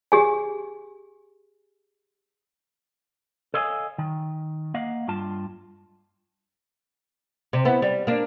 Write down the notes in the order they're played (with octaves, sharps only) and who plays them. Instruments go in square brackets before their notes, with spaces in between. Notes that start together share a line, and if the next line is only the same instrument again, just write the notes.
[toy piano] G4 G#4 G#5
[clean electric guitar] A4 C#5 D#5 F5 G5 G#5
D#3
A#3 D#5 F5 F#5
G2 F4 A5
[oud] C3
B3 E4
G3
A#3 D4